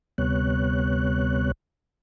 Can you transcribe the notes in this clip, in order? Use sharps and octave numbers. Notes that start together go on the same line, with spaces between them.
D2 C3 G3 B3 C#5 F#6